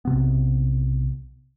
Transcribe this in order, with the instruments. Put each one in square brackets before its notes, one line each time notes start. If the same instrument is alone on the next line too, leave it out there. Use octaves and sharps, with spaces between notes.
[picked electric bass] B1 C3 B3